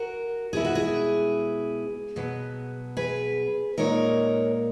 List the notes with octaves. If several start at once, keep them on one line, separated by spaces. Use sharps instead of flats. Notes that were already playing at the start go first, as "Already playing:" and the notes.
Already playing: F#4 A#4
B2 G#3 B3 E4 G#4
F#4
G#4
B2 F#3 B3
G#4 B4
A#2 G#3 D#4 A#4 C#5